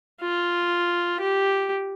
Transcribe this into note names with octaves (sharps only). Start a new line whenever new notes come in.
F4
G4